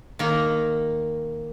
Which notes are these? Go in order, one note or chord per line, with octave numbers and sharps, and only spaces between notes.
D#3 A#3